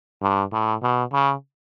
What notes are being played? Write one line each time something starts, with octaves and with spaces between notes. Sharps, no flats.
G2
A2
B2
C#3